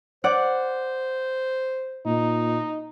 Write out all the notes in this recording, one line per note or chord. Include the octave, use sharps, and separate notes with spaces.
C5 D5 F#5
A#2 D#4